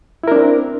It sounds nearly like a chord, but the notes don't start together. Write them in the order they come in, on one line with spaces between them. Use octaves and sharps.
E4 A#4 D4 C4